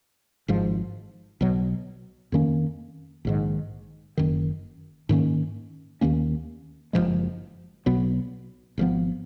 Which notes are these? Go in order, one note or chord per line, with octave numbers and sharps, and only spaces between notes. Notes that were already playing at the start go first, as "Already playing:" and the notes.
G#1 G#2 F3
B1 B2 F#3
F2 D#3 A#3 C#4
A#1 G#2 D#3
F#1 F#2 D#3
G#2 D#3 A#3 C#4
D#2 D#3 A#3 C#4
F#1 F#2 F3 G#3
B1 B2 F#3 B3
G#1 G#2 F3 B3